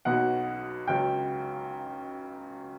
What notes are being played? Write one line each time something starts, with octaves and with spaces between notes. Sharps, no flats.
B1 B2 F#3 F#5
C#2 C#3 F#3 G5